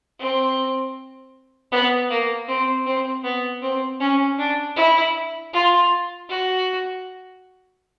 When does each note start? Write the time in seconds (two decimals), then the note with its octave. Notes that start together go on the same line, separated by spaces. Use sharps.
0.20 C4
1.72 B3
2.10 A#3
2.48 C4
2.86 C4
3.24 B3
3.62 C4
4.00 C#4
4.39 D4
4.76 E4
5.53 F4
6.29 F#4